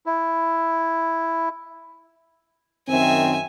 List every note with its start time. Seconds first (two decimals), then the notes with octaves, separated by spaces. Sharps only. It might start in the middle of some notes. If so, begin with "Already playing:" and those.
0.06 E4
2.89 F#2 D#3 C4 E5 G#5